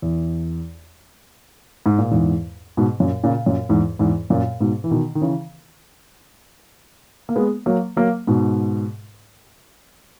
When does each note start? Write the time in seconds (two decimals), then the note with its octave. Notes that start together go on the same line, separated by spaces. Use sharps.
0.02 E2
1.86 G#2
1.98 A#2
2.11 E2 G#2
2.77 G#2 B2
3.00 F#2 A#2
3.24 A#2 C#3
3.46 F#2 A#2
3.69 E2 G#2
3.99 E2 G#2
4.30 F#2 A#2
4.61 G#2 B2
4.84 E3
4.91 B2 D#3
5.15 D#3
5.21 C#3 E3
7.29 A#3
7.36 G#3 B3
7.66 F#3 A#3
7.97 F#3 A#3
8.27 G#2 B2